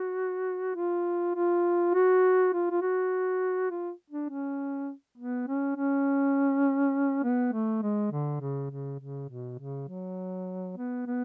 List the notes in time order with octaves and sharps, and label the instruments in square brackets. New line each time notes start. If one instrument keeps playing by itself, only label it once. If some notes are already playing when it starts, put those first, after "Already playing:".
Already playing: [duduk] F#4
F4
F4
F#4
F4
F4
F#4
F4
D4
C#4
B3
C#4
C#4
B3
A3
G#3
D3
C#3
C#3
C#3
B2
C#3
F#3
B3
B3